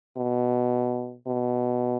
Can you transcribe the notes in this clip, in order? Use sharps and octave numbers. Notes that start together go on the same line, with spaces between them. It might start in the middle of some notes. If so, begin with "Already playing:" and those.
B2
B2